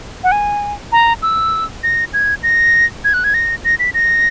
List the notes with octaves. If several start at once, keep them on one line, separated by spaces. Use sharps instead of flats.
F#5
G#5
A#5
E6
A#6
G#6
A#6
G#6
F#6
G#6
A#6
A#6
B6
A#6